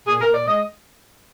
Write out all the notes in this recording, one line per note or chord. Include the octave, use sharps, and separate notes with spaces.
A#2 G#4
A#4
A#2
D5
G#3 D#5